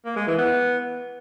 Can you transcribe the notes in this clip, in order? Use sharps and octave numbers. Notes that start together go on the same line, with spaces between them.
A#3
G#3
E3
B3